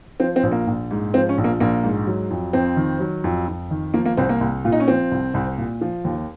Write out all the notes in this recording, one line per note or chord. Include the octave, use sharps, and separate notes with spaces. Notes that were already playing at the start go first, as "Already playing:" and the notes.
F3 C4
C4
A#1
A#3
A#1
G#2
F3 C4
C#4
A#1
A#3
A#1 A#3
G#2
F#3
F2
F2 C4
D#3
F#3
F2
F2
D#3
F3 A#3
A#3
C2 C4
A#3
C2
A#2 F4
D#4
C#4
F3 C4
C2
C2
A#2
F3
D#2